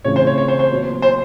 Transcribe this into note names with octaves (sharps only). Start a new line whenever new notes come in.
C#3 E3 A3 C4 F4 C#5
C5
C#5
C#5
C5
C5
A#2 F#3 B3
C5